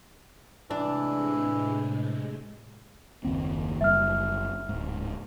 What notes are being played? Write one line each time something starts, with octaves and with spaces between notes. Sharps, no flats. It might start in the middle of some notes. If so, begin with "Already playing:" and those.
A2 C3 E3 G#3 D4
F#1 D#2 C4
F#1 G3 E5 F6
D1 G#2